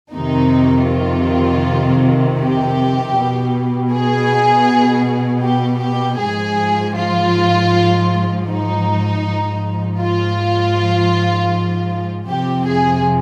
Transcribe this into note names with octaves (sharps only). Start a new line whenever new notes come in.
F2 C3 D#3 D#4
F4
G4
B2
G#4
G4
G4
G#2 F3 G#4
F4
D#4
G#2 F3
F4
F2 C3 F3 G4
G#4